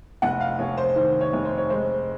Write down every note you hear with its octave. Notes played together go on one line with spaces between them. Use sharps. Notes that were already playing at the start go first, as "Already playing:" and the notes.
F1 F#5
F5
F1 C#5
C5
D#3 C5
C#5
F1
C5
C#5
G#3 C5